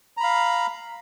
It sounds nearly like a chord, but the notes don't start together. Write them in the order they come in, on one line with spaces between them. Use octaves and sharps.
A#5 B5 F5